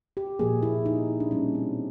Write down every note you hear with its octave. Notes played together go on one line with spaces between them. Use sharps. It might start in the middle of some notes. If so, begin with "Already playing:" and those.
G4
A#2 F3 A#3 G#4
E4
D#4
D4
B2 G3 A#3 C#4
C4